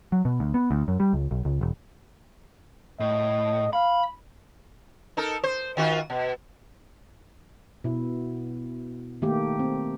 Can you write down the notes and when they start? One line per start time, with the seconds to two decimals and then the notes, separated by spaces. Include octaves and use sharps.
0.12 F#3
0.25 B2
0.40 D2
0.54 B3
0.71 D2
0.88 F#2
1.00 G3
1.13 C#2
1.31 B1
1.45 C#2
1.61 E1
3.00 A2 D#5
3.73 F5 B5
5.17 D#4 A4 A#4
5.44 C5
5.77 D#3 F4 F#4
6.10 B2
7.84 B2 E4
9.22 D#3 A3 A#3 G4
9.59 C4